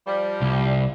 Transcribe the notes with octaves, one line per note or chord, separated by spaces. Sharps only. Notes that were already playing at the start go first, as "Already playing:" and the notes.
F3 G3
C2